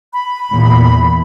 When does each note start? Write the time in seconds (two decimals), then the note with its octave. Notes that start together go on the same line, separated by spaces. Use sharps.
0.13 B5
0.51 E2 A#2